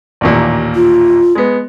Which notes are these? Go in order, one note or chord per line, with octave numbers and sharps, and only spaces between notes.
A1 D#2 A#2
F4
G#3 B3